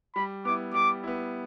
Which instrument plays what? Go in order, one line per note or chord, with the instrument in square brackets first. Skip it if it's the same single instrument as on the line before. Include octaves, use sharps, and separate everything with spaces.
[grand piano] G3 [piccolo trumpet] B5
[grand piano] B3 E4 [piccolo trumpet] D6
[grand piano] G3 [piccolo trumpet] D6
[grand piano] B3 E4